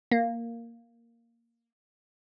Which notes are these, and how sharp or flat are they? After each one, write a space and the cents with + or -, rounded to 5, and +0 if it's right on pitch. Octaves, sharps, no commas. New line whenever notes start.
A#3 -5